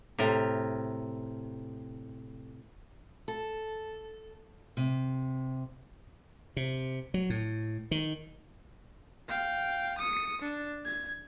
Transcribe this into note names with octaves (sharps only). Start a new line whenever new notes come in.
A2 C3 A#4
A4
C3
C3
F#3
A2
D#3
F5 G5
D#6 C#7
D4
G#6